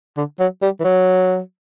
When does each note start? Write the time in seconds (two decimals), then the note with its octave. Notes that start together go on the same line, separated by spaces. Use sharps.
0.17 D3
0.40 F#3
0.62 G3
0.80 E3
0.84 F#3